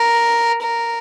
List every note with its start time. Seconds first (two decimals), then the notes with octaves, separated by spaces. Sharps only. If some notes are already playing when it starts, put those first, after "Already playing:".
Already playing: A#4
0.63 A#4